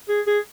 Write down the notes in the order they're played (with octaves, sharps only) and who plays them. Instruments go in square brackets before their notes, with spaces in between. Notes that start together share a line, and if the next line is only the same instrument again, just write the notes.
[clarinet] G#4
G#4